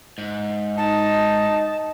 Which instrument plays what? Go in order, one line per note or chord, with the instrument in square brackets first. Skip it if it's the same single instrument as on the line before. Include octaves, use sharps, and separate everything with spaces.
[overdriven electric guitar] G#2
[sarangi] D#4 [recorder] A5